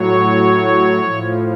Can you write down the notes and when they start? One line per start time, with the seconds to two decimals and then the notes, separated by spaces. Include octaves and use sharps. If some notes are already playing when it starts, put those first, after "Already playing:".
Already playing: A2 F#3 C#5
1.00 A2 F3